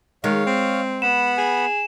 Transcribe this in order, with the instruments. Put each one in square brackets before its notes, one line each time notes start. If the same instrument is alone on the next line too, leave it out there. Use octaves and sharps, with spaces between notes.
[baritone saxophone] D#3 [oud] G#3 [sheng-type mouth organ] C#5 F5
[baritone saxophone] C4
[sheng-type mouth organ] B3 F#5 B5 [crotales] E7
[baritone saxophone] G#4